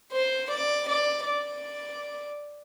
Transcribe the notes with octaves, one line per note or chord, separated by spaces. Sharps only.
C5
D5
D5
D5